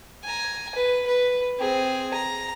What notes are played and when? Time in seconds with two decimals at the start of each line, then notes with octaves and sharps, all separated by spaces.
0.24 G#5 A#5
0.75 B4
1.06 B4
1.59 C4 G#4
2.14 A#5